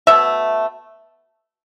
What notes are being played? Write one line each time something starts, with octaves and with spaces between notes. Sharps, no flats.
B2 A3 E5